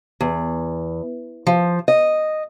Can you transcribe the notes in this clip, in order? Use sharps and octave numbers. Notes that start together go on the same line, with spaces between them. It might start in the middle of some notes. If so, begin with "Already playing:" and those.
E2
F3
D#5